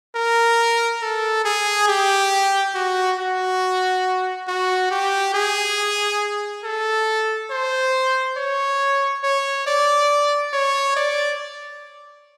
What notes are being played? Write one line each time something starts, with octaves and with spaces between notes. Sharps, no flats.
A#4
A4
G#4
G4
F#4
F#4
F#4
G4
G#4
A4
C5
C#5
C#5
D5
C#5
D5